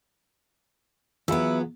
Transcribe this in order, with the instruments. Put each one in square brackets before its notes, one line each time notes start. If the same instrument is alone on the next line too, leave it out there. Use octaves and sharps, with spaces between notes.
[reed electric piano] E3 F4 G#4 [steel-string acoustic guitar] F#3 B3 [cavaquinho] E4 E5